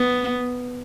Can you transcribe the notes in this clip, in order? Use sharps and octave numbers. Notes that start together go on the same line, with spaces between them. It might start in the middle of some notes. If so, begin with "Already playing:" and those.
Already playing: B3